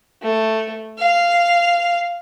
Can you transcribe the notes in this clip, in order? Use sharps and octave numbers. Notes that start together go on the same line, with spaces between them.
A3
F5